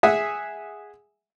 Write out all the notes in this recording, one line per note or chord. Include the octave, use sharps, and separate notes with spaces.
G#4 E5 F#5 G#5 D#6